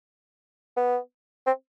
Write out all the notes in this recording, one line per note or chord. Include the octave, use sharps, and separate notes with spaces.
B3
C4